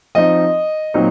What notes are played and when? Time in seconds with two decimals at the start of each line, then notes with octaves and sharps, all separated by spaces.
0.15 F3 C4 D#4 D#5
0.94 A#2 F#3 C4 D#4